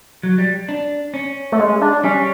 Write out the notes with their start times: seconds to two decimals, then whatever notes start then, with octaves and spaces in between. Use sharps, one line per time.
0.23 F#3
0.38 G3
0.69 D4
1.14 C#4
1.52 A3
1.59 G#3
1.81 D4
2.04 G3 C#4